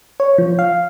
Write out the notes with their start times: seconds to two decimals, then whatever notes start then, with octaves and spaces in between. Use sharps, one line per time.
0.20 C#5
0.38 F3
0.59 F5